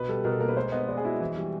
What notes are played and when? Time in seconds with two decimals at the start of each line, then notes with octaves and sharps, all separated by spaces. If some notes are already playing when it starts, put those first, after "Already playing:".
Already playing: B2 B4
0.08 G3 A4
0.24 B2 A#4
0.32 A4
0.40 A#3 A#4
0.48 B4
0.57 G#3 C5
0.72 B3 D#5
0.88 G#3 D5
0.97 G#4
1.04 E4 F#4
1.20 E3
1.36 G3